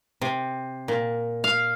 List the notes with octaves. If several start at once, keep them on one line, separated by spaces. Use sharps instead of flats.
C3
A#2
F5